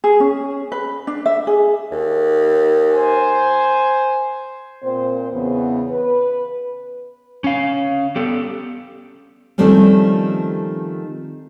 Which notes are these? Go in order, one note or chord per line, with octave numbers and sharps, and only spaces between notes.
G#4
C#4
B4
D4
E5
G#4
D#2
C5 G#5
A#2 C4 C5
E2 C#3 B3
B4
C#4 F5
B3 G4 A4
D#3 F3 G3 A3 C4 C#4